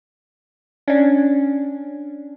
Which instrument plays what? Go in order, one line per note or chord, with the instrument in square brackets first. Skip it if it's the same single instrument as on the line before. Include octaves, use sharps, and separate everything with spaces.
[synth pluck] C#4 D4